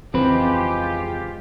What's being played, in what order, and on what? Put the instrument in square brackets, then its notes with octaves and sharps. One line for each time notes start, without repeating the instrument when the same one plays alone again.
[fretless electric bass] F2 C#3 E3 [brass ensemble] G#3 F4 G4 [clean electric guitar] C4 B4